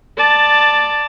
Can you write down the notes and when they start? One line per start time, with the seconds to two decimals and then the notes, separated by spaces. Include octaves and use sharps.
0.17 D5 A5